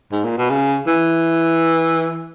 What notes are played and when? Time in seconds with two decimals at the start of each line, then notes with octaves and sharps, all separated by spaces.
0.12 G#2
0.25 A#2
0.38 B2
0.50 C#3
0.87 E3